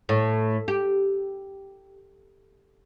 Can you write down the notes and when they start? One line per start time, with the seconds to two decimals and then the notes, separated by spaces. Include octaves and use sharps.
0.09 A2
0.68 G4